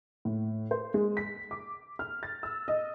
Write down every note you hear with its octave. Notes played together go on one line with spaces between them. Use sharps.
A2
C5
G#3
B6
D6
F6
A6
E6
D#5